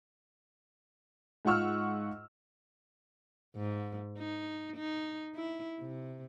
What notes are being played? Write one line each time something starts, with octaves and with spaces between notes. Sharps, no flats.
G#2 F4 F#5 C#6 E6 F6
G#2
D#4
D#4
E4
C3